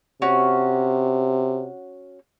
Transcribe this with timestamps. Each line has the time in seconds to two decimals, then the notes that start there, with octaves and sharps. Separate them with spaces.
0.22 C3 C#4 F#4